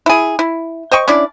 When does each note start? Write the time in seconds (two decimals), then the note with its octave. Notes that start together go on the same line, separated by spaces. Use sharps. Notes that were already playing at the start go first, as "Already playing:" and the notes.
0.06 E4 G#4
0.39 E4
0.91 C5 D#5 G5 C#6
1.08 C#4 D4 E4 D5